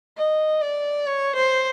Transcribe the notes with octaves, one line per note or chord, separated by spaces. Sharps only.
D#5
D5
C#5
C5